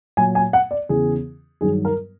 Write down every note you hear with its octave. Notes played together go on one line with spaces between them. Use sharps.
A#2 F#3 G#5
G#5
F#5
D5
E2 C#3 E3 G#4
G2 D#3 F#3 G#4
A#4